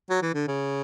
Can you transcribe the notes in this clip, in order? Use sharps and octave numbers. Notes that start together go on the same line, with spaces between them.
F#3
E3
D3
C#3